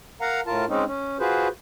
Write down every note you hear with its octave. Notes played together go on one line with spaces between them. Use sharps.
A#4 F5 F#5 A#5
A2 F4 A#4 A5
G#3 C4 C#4 D#4
C#4
F4 F#4 G#4 B4 C5